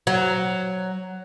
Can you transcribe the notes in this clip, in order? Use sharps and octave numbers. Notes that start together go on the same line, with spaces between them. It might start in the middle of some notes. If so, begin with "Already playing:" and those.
F#3